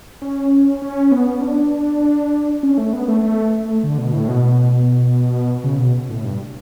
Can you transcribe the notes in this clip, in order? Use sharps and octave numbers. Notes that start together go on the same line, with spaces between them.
C#4
C#4
B3
D4
C#4
A3
B3
A3
A3
D3
B2
A2
B2
C#3
B2
A2
G2